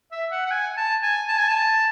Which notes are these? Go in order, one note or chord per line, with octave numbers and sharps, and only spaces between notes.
E5
F#5
F#5
G#5
A5
G#5
A5
G#5
A5